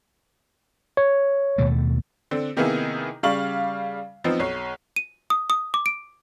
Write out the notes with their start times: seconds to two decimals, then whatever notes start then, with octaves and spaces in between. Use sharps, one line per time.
0.97 C#5
1.58 D#2 B2 A3
2.31 D3 C4
2.57 C3 D#3 A#3 B3 E4 G#4
3.23 C#3 G3 D5 F5 C#6 F#7
4.24 F3 B3 C4 D#4
4.39 B1 C#5 C7
4.96 D#7
5.30 D#6
5.50 D#6
5.74 D6
5.86 D7